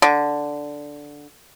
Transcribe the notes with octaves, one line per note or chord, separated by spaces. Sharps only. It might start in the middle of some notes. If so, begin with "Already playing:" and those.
D3